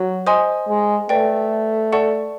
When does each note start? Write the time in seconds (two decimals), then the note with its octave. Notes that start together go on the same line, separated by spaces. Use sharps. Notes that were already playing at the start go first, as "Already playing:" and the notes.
Already playing: F#3
0.26 C5 D#5 G#5 C6 D#6
0.68 G#3
1.09 A3 B4 D5 G5
1.92 A4 D5 F#5 A5 C#6